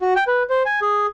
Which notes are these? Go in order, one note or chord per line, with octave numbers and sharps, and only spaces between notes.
F#4
G5
B4
C5
G#5
G#4